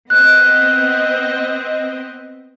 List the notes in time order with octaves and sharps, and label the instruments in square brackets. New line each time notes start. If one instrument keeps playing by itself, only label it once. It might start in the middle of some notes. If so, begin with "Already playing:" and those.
[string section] B3 C4 D#5 [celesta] F#6